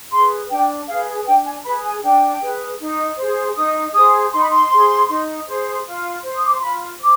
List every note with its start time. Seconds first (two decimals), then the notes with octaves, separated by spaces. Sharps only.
0.11 G#4 B4 C6
0.49 D4 G5
0.87 G#4 B4 F5
1.26 D4 G5
1.45 G#5
1.65 G#4 B4 B5
1.83 G#5
2.02 D4 G5
2.41 G#4 B4
2.79 D#4
3.17 G#4 C5
3.55 D#4 D#6
3.93 G#4 C5 D#6
4.31 D#4 C6
4.41 B5
4.50 C6
4.70 G#4 C5
5.08 D#4
5.47 G#4 C5
5.85 F4
6.23 C5
6.36 D#6
6.45 D6
6.53 C6
6.61 F4 B5
6.99 C5 D6